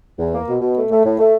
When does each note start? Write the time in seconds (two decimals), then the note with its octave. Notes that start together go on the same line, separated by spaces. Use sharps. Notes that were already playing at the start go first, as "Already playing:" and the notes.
0.18 E2
0.34 A#3
0.48 B2
0.61 B2
0.76 A3
0.91 A3
1.05 A2
1.20 A3